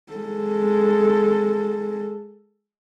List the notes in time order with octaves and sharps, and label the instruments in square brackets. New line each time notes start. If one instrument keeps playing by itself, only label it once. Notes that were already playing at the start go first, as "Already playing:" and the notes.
[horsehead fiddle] G#3 A4